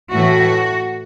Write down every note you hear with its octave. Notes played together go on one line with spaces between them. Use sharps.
A2 E3 A3 F#4